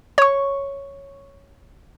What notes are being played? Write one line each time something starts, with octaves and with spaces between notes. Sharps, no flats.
C#5 C#6